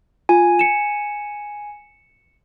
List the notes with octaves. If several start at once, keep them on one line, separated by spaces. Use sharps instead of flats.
F4 G#5
C#7 E7